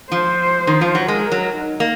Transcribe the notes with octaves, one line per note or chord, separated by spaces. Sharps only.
F3 C5
D#3
F3
F#3
G#3 A#4
F#3
D#4
A#3